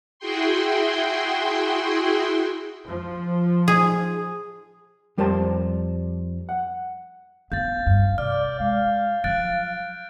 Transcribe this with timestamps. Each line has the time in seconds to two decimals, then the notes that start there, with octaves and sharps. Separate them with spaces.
0.19 E4 F#4 G#4 G5 C6
2.87 F3
3.68 G#4
5.18 F2 G3 A#4 C5 A5 C6
6.49 F#5
7.52 B3 F5 G6 A6
7.86 G2
8.18 C3 D5 F6
8.60 G#3 F5
9.24 F3 F#3 F#6 A6 D7